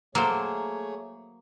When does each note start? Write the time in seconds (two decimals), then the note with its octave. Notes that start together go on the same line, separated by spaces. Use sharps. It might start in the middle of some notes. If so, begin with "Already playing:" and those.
0.15 F#3 A3 A#3 G#4 A4 C5 C#5 A#5